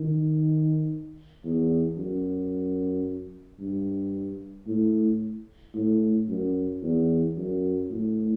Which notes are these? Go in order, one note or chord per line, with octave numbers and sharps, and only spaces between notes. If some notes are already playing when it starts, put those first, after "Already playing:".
Already playing: D#3
E2
F#2
G2
A2
A2
F#2
E2
F#2
A2